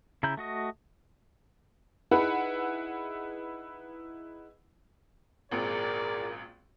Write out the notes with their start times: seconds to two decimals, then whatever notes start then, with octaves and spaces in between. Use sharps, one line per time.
0.23 C#3 E4 A#5 B5 G6
0.37 A3 F#4 D#5
2.11 D#4 E4 G#4 B4 F#5 B5
5.52 G#1 C#2 A#2 G#4 A#4 D5